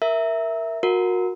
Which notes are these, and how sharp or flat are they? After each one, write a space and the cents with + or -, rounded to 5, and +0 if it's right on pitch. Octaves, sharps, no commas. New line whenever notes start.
A#4 +0 E5 +0
F#4 -25 A#4 +0